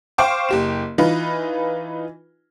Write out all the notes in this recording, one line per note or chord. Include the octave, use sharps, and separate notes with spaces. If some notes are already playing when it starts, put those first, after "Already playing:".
C5 F5 G5 C#6 D6
F#1 G4 E7
E3 D#4 F4 B4